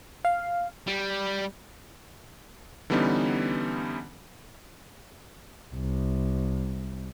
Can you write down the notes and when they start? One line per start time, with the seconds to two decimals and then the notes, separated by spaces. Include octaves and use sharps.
0.25 F5
0.87 G3
2.90 D3 E3 G3 B3 C#4 D#4
5.74 C2